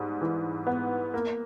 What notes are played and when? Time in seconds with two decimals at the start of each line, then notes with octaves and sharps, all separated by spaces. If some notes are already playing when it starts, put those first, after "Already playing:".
Already playing: G#2 G3
0.21 E3
0.67 B3
1.14 A#3